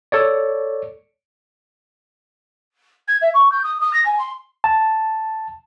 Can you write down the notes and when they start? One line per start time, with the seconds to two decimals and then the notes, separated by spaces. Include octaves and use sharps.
0.12 A4 C#5 D5
3.07 G#6
3.21 E5
3.34 C#6
3.51 G6
3.63 D#6
3.80 D#6
3.93 A#6
4.05 G#5
4.18 C6
4.64 A5